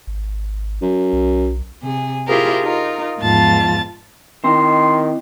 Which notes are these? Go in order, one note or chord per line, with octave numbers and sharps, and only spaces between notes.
G#1
F#2
B1
C3 G#4
E4 F4 G4 G#4 A#4 C5
D#4 F4 A#4
E2 G#2 F3 F4 A5 A6
D#3 C4 E4 D#5 C6